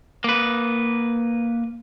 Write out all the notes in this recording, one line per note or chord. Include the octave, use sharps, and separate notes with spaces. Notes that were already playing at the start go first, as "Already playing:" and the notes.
A#3 B4